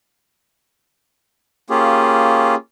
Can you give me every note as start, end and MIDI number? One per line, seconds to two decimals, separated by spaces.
1.70 2.55 58
1.70 2.55 61
1.70 2.55 65
1.70 2.55 67
1.70 2.55 68